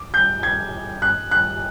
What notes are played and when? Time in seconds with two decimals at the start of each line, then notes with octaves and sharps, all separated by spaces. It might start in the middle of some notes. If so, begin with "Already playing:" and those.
Already playing: D6
0.14 G6
0.43 G#6
1.02 F#6
1.31 F#6